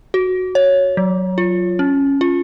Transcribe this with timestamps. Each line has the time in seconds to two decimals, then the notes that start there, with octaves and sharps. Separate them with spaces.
0.14 F#4
0.55 C#5
0.97 F#3
1.38 F4
1.79 C#4
2.21 F4